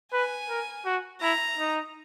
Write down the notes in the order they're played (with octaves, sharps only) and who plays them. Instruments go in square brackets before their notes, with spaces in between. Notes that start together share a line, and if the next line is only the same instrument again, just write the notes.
[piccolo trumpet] B4 [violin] G#5
[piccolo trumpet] A#4
F#4
[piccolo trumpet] E4 [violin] A#5
[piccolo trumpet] D#4